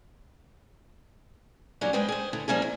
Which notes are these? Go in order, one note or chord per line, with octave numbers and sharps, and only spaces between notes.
C#3 F#3 G3 A#3 C#4 D4
E2 G#3 G#4 B4 C5 G5
G#4 C5
A2 D3
F3 G3 A#3 C#4 G#4
C3